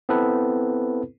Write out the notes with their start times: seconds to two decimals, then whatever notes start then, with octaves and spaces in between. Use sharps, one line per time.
0.09 B3 C4 E4 A4 B4